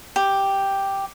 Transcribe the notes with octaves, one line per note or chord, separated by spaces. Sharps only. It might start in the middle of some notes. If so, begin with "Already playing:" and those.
G4